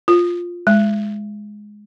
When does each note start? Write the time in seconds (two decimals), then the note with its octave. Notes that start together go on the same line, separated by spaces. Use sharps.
0.08 F4
0.67 G#3